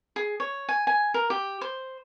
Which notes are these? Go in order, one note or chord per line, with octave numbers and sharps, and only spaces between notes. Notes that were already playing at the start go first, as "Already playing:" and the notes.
G#4
C#5
G#5
G#5
A#4
G4
C5